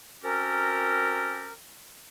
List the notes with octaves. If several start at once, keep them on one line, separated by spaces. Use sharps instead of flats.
C4 C#4 F#4 G4 A4 A#4